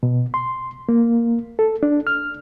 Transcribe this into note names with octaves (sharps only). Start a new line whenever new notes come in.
B2
C6
A#3
A4
D4
F6